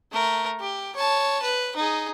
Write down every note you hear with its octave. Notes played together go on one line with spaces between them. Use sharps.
A3 A#4
G4
C#5 A5
B4
D#4 G#4